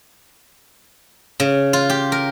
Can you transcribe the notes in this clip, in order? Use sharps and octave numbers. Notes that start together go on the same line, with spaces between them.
C#3
F4
G4
A#4